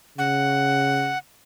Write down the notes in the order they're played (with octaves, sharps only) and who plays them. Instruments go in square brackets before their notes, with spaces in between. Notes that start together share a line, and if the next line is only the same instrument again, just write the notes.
[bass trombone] C#3 [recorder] F#5